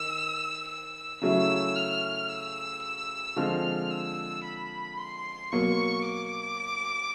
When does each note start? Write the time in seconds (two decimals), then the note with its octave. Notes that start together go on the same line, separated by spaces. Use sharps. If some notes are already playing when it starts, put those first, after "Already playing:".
Already playing: D#3 E6
0.68 E6
1.22 C#3 F#3 A3 C#4 E4 E6
1.76 F6
2.29 E6
2.83 E6
3.36 D3 F3 G#3 C4 F6
3.91 E6
4.44 B5
4.98 C6
5.52 B2 F#3 A#3 C#6
6.05 D6